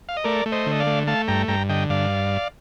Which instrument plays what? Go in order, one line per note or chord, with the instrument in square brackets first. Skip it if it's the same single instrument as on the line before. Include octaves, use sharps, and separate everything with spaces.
[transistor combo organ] F5
D#5
A3 A#4 D5
A3
C5 D#5
D3
D#5
D5 F5
A3
A3 F5 A5
G2 G5 A#5
G2 G5 A#5
D3 D#5 G5
G2 D5 F5